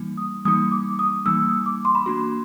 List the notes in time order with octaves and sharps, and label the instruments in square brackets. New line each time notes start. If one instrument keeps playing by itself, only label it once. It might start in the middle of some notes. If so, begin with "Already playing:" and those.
Already playing: [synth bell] E3 G3 A#3 D#4
[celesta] D#6
[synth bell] E3 G3 A#3 D#4 [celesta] D#6
[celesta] D6
D#6
[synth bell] E3 G3 A#3 D#4 [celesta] E6
[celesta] D#6
D6
C6
B5
[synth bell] A#3 D4 F#4 [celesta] C6